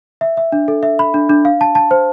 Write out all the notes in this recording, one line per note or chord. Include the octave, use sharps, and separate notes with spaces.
E5
E5
D4
A4
E5
B5
D4
D4
F5
A5
A5
C5